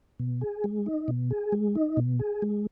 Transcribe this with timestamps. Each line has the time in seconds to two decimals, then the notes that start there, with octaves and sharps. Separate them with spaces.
0.20 B2
0.41 G#4
0.64 G#3
0.86 D#4
1.08 B2
1.30 G#4
1.52 G#3
1.75 D#4
1.97 B2
2.19 G#4
2.42 G#3